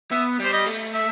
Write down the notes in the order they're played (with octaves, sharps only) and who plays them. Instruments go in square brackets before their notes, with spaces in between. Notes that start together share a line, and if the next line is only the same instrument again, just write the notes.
[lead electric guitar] B3 [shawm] E5
[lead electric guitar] G3 [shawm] C5
[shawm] D#5
[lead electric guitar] A3
[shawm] E5